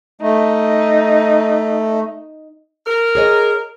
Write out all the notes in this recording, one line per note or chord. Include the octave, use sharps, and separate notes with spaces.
A3 D#4
A#4
G#4 C#5 D#5